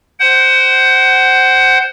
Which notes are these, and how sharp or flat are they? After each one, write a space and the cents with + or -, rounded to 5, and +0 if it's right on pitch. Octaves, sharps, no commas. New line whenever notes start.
C5 +0 F#5 +25